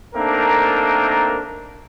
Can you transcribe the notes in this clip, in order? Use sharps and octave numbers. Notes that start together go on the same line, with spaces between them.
A3 A#3 C4 D4 D#4 A#4